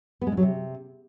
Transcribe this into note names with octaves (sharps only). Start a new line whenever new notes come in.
B3
G#3
D3
F#3
C3